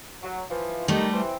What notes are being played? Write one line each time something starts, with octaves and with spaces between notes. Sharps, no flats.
F#3
E3 F3
D#3 G3 A3
E3 C4